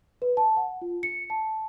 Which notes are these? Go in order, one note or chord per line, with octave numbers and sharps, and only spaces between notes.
B4
A5
F#5
F4
C#7
A5